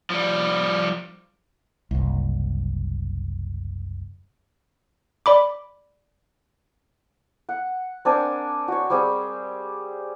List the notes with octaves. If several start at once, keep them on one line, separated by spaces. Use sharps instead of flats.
F3 G3
F#1 C2
D5 B5 D6
F#5
C4 D4 A#4 G#5
F#4 C#5
G3 C4 G4 G#4